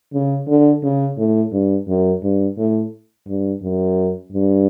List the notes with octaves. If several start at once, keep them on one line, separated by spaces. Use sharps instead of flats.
C#3
D3
C#3
A2
G2
F#2
G2
A2
G2
F#2
G2